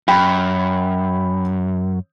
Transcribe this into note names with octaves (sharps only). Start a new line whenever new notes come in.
F#2 G5 B5